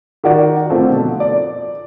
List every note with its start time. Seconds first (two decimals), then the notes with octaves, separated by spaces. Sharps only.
0.24 D#3 F#4 D5
0.70 D3 A3 C4 F4 A4
0.90 B2 F3
1.20 D5